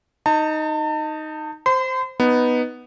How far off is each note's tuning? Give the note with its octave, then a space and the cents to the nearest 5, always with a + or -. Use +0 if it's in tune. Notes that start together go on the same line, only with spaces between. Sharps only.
D#4 +0 A5 +40
C5 +0 C6 -40
B3 +0 D#4 +0